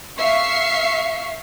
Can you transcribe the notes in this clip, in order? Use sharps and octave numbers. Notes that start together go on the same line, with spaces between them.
E5 F5 C#6 C7